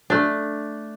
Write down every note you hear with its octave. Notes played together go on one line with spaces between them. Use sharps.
A3 D4